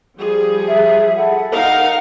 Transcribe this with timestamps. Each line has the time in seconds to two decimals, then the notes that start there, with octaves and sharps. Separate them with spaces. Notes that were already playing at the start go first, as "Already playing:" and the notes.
0.19 F3 G3 G#4
0.67 E5
1.16 A4 F#5 B5
1.52 D#4 A#4 F5 F#5